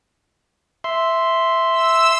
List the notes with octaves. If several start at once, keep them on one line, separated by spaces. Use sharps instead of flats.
E5 C6
E6